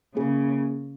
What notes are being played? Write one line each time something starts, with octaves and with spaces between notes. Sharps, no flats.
C#3 A#3 C#4 G#4